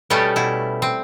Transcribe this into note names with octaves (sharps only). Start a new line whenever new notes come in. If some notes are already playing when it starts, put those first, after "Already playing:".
B2 G3 A3 B3 C#4 G4
B2 E4
C4